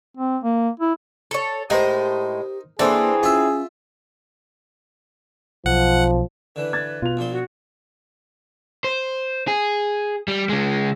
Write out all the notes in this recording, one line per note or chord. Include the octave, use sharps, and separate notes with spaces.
C4
A#3
E4
A4 C#5
A2 G#3 D#4 G4 A#4 C5
E3 A#3 C4 D4 G#4 A4 C5
C#4 F4 E5
B1 F3 F#5
D3 E3 B4
G#6 A6
B2 F4 F7
A#1 A#2 C5
F#4
C5
G#4
G3
C#3 G#3